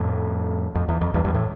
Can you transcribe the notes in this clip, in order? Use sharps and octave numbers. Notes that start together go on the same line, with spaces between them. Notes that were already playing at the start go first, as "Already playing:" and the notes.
Already playing: F2 A2
F2
E2
F2
E2 G2
E2 G2
A2